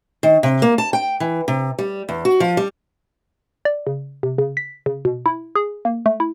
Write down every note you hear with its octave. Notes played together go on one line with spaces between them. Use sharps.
D#3
C3
A#3
A5
G5
E3
C3
G3
E2
F#4
F3
G3
D5
C#3
C3
C#3
B6
C#3
B2
E4
G#4
A#3
A3
E4